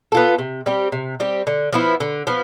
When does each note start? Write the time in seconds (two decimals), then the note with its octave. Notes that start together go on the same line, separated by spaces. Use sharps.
0.12 B3 F4 A4
0.38 C3
0.66 G3 C4 G4
0.92 C3
1.20 G3 C4 G4
1.47 D3
1.73 F3 B3 E4
2.00 D3
2.27 F3 B3